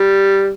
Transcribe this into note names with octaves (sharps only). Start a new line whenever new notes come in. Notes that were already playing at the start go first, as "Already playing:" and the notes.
Already playing: G3